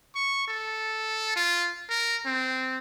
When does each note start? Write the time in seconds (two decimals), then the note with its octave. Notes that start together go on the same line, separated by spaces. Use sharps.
0.15 C#6
0.48 A4
1.36 F4
1.90 A#4
2.26 C4